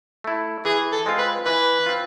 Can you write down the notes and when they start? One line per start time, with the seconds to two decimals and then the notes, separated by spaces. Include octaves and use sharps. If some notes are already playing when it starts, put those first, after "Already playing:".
0.24 A3 E4
0.65 E3 G#4
0.93 A4
1.06 G#3 C4 F4
1.18 B4
1.46 E3 B4
1.86 C4 F4